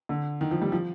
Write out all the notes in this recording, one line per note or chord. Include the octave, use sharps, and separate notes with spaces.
D3
D#3
F3
G3
F3